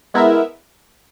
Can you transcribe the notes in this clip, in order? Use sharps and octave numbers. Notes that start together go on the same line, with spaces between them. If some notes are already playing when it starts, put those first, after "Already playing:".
G#3 B3 E4 A#4 E5